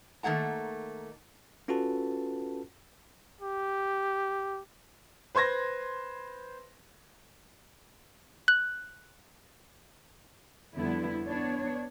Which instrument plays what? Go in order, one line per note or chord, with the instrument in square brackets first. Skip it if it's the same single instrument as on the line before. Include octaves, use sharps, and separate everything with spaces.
[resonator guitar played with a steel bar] D#3 A3 A#3 F#5 A#5
[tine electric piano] C#4 F4 F#4 A4 B4 A5
[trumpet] G4
[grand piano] B4 C5 C6 G#6 A#6
[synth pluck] F#6
[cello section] F2 D3 G3 B3 E4
B3 D4 C#5